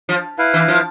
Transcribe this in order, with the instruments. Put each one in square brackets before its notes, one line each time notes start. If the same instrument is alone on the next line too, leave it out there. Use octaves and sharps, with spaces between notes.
[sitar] F3
[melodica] E4 B4 F5
[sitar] E3
F3